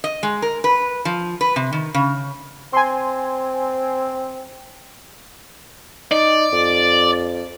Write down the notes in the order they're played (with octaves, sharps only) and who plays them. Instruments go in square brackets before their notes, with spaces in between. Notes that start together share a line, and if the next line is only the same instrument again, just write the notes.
[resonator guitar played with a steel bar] D#5
G#3
A#4
B4
F3
B4
C3
D#3
C#3
[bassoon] C4 [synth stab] G#5 C6
[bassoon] D#4 [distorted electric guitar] D5
[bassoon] F2